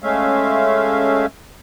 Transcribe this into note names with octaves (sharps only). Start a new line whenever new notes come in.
G#3 A3 C#4 E5 F5